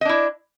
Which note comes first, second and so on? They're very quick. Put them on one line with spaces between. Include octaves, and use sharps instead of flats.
D#5 D4 E4